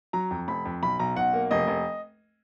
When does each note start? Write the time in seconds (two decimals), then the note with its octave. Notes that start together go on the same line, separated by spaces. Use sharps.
0.13 F#3 A#5
0.31 F2
0.48 F1 B5
0.65 F2
0.82 B1 B5
0.99 B1 A#5
1.17 B1 F#5
1.33 A#3
1.51 F1 D#5
1.68 F1